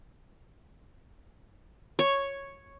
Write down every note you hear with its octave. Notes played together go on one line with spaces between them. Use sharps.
C#5